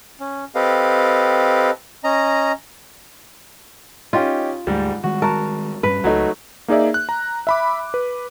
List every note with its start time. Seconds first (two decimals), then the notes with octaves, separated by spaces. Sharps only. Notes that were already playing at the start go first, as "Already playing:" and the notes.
0.20 C#4
0.55 C4 G4 A4 B4 D#5 F5
2.04 C#4 D#5 A#5
4.13 C#4 D#4 F4 G4
4.67 D2 G#2 G3 A3
5.04 D#3 G3 G#3 F#4
5.22 F#4 A#4 A5
5.83 G2 G3 C#4 B4
6.04 C#2 F#3 A3 D#4
6.68 A#3 D#4 G#4 D5 E5
6.94 F#6
7.09 A#5
7.47 E5 B5 D6
7.94 B4